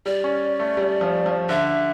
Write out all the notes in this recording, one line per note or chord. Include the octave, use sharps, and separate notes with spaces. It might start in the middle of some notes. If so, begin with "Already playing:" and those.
G3 D5
C#4
A3
G3
F3
F3
D3 E5